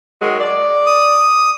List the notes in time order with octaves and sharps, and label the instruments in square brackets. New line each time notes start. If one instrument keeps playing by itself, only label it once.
[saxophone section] D#3 F#3 G#3
D5
[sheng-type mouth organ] D#6